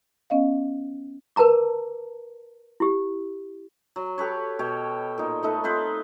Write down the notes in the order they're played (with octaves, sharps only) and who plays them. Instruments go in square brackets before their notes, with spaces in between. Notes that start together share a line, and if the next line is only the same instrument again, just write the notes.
[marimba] B3 C#4 D#5 F5
[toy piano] A#4 B4 A5 A#5 D6
E4 G4
[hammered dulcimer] F#3
G4 A4 B4 C#5
B2 C#5 G5
A#2 D#4
A3 D#4 A4 B4
C4 F4 B4 C5